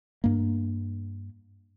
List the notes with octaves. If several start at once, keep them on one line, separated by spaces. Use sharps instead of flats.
G2 A#3